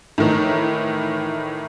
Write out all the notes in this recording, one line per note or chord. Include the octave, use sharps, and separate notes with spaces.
A2 D#3 E3